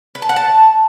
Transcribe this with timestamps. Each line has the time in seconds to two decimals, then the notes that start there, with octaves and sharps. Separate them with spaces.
0.15 B4
0.22 A5
0.29 F#5
0.36 A5